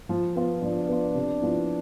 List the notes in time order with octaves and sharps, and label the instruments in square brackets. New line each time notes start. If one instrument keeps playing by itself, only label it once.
[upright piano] F3
B3 F4
[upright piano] F3 [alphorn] D4
[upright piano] B3 F4
C3
F3 B3 E4